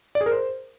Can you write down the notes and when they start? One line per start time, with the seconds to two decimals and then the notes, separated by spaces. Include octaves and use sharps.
0.15 D5
0.21 G#4
0.26 A#4
0.32 C5